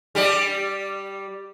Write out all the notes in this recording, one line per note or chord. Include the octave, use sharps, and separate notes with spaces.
G3 G4 D5